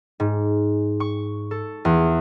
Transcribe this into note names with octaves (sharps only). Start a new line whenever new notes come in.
G#2
C#6
A4
E2